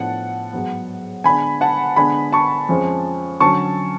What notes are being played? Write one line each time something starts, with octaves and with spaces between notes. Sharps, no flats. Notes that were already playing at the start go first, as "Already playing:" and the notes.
Already playing: A2 F3 B3 D4 F#5 A5
G#2 F#3 B3
D3 G#3 B3 D4 G#5 B5
F#5 A5
D3 G#3 B3 D4 G#5 B5
A5 C#6
F2 F3 G#3 C#4
D3 F#3 C#4 A5 C#6